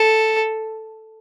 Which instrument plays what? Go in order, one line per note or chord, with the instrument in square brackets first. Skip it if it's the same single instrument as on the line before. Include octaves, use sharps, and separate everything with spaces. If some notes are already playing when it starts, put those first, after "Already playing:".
Already playing: [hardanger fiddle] A4